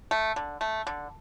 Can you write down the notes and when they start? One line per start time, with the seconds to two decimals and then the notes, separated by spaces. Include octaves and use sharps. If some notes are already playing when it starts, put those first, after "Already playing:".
0.11 A3
0.36 D3
0.61 A3
0.87 D3